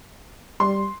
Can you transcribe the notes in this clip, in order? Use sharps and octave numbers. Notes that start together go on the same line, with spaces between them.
G3 C6